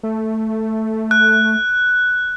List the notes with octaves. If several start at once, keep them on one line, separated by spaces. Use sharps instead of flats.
A3
F#6